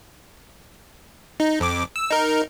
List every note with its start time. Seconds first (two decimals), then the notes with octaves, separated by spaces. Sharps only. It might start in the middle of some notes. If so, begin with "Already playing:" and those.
1.40 D#4
1.60 F2 D6
1.96 E6
2.10 D#4 A#4